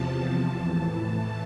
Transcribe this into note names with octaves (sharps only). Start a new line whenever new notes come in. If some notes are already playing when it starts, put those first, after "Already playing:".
Already playing: E2 C3 F3 A5
A5
A2 E3
A5